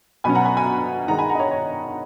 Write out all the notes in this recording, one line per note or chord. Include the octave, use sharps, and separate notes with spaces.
B2 F#3 C#4 G#5 B5
F#5 A#5
G#5 B5
G#5 B5
D#3 G#3 D#4 F#5 A#5
G#5 B5
F#5 A#5
D#5
C#5
C#5